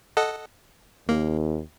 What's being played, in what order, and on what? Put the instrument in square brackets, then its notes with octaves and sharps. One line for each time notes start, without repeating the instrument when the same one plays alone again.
[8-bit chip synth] A4 D#5 F#5
[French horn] D#2 [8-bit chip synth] A#3